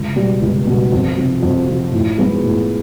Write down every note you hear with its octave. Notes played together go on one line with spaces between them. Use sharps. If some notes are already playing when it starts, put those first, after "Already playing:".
Already playing: C#2
B2 G3
C#2
B2 G3
F2
C3 F3
F2
C3 F3
A2
F3 G#3 B3
A2